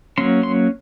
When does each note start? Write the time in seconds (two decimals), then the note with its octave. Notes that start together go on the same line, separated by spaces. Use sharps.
0.18 F#3 A#3 C#4 C6
0.43 C6